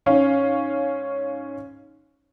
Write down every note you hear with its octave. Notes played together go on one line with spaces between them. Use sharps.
G#2 C#4 F5